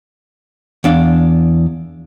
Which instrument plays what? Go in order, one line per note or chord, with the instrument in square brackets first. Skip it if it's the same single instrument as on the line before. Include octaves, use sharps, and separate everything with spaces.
[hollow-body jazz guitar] E2 D4 F5